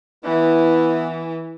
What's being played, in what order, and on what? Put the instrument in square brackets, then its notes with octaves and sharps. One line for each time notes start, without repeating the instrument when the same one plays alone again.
[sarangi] E3 [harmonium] B3 E4 B4